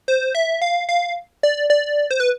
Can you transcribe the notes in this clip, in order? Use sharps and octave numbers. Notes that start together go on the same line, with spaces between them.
C5
E5
F5
F5
D5
D5
C5
B4